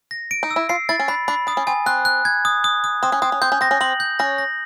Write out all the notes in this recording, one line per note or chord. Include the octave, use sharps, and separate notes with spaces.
A#6
D7
D#4
E6
E4
F4 C7
E4 A6
C#4
D4 B5
D4 B5
D4 D#6
C#4
C4 G#5
C4 F#6
F#6
G#6
D#6
D#6
D#6
C4 D#6
C#4
C4 D#6
C#4
C4 G6
C#4
C4 A#6
C#4
C4 F#7
G6
C#4 A#6
A#6